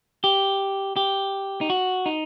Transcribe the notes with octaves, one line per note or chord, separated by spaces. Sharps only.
G4
G4
D#4
F#4
D#4